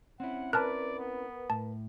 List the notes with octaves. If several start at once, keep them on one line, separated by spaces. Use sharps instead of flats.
C4 C#4 E4 F#5
A#4 B4 D5 A5 F6 F#6
B3
A2 A5